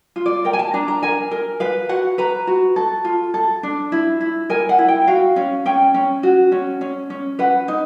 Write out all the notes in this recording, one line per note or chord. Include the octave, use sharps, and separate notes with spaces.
F4
D5
A#4 G5
G#5
A5
D4 A#5
A#5
A#4 G#5
A#4
B4 F5
F#4 F#5
B4 A#5
F#4
A4
F4
A4
D4
E4
E4
A#4 G#5
F#5
E4
G5
F#4 F5
C#4
C#4 G5
C#4
F#4
C#4
C#4
C#4
B4 F#5
D#4